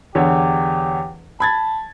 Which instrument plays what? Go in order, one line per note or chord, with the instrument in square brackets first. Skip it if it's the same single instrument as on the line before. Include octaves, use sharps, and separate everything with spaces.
[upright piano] E2 D3 C#5 [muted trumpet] G4
[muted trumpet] A5 [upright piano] B5 G#6 A6